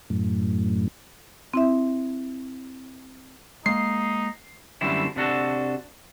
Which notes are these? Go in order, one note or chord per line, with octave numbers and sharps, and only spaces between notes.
F#2 A2
C4 E4 E5
G#3 A#3 D#4 C7
F#2 D3 G3 A3 C4 E4
C3 D4 F#4 A4